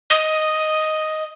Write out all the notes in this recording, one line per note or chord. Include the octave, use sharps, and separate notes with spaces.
D#5